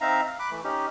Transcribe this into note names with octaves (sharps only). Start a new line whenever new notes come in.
C4 D#4 E5 F5 A#5
F5
B5 D6 F#6
E3 A3
C#4 D#4 G4